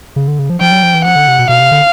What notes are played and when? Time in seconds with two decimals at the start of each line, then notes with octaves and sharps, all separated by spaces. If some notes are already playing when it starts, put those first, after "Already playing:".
0.16 C#3
0.28 D3
0.39 C#3
0.50 F3
0.61 F3 G5
0.71 F#3
0.83 F3
0.94 E3
1.04 F3 F#5
1.16 D3
1.28 C3
1.39 B2
1.49 B2 F5
1.60 C3
1.71 D3